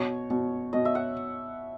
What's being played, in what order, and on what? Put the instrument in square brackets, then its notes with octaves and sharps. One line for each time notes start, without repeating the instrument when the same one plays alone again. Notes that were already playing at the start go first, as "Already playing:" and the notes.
Already playing: [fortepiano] B2 [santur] C#5
[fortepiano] B2
[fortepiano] B2 [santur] D#5
[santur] E5
F#5